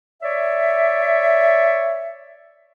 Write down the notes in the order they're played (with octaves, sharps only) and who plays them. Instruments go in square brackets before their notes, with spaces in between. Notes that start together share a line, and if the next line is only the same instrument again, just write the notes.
[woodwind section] C#5 D5 E5